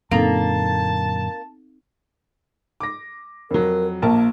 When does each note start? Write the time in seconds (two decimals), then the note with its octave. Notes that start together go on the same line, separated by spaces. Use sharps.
0.11 F#2 A#2 D3 A#3 C4 D#4 A4 A5
2.80 D6 A#6
3.51 F2 F#3 A#4
4.02 A#1 A#3 A#4 A5